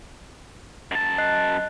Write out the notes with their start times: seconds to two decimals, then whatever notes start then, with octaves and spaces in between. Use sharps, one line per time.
0.92 F#2 A5
1.18 D#5 F#6 C7